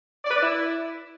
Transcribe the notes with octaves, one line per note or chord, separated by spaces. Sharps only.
D5
B4
D5
E4